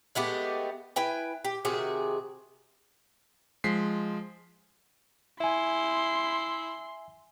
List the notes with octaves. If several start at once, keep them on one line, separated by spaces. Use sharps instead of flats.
G#3 A3 B3 G4
E4 B4 G5 G#5
G4
C3 D#3 F#4 G#4
F3 G#3 B6 C7
E4 E5 G#5 C6